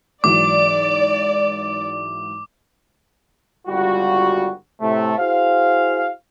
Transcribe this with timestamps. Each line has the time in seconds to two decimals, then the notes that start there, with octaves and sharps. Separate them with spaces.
0.24 G#2 E3 F#3 D5 D6
3.68 G1 C#2 G3 F4 F#4
4.81 A2 C3 A3
5.18 E4 F#4 G#4 C5 F5